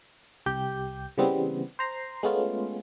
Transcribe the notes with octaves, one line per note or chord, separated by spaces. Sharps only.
C2 G4 G6
C#3 E3 G3 B3 C4
C5 A#5 C7
G#3 A3 B3 C#4 F4